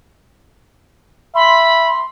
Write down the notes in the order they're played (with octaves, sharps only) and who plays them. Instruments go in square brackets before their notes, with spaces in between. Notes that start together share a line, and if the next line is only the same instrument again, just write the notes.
[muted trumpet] E5 [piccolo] B5 [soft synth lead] C6